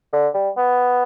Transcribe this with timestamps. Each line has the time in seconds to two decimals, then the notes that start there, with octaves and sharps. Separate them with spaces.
0.13 D3
0.34 G3
0.57 B3